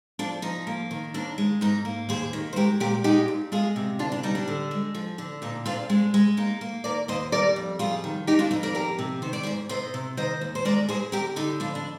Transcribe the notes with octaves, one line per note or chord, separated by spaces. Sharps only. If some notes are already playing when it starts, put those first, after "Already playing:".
F3 D4
F3 D#4
A#3
D#3
D#2 D4
G#3
G#2 D#4
A#3
D#2 G#4 C5
D#3
C5
G#3 G4 A#4
A#2 G4 A#4
G#3 D#4 G4
A#2
G#3 F4 G#4
C3
D2 D4 F4
D4
G3 D#4
D4
D3
G#3
F3
D3
A#2 D#4
C4 D4 F4
G#3 D4
G#3
A#3 D#4
A#3
D#3 A#4 D5
D#2 C5 D#5
G3 A#4 D5
F2
G3 F4 G#4
D#3
D#3 D#4 G4
D4 F4
F2 D#4
A#4 D5
A#3 G4 A#4
C3
D#3 C5
D5
G#2 G#4 C5
C3 C5 D#5
C3
D#3 C5 D#5
D#2
C5
G#3 A#4 D5
G2 G#4 C5
D2 G4 A#4
D3 D#4 G4
F2 D4 F4
D4